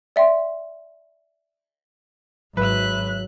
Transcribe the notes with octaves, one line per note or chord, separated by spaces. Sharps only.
D5 E5 G5 C6
G#1 F#3 B4 E5 F#6